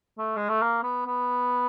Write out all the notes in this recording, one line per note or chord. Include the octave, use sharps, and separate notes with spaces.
A3
G#3
A3
A#3
B3
B3